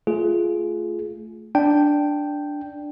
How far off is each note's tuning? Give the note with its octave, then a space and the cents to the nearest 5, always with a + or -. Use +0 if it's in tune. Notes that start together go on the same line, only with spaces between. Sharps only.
A3 +0 F4 -5 G#4 +20
D4 +0 G5 +0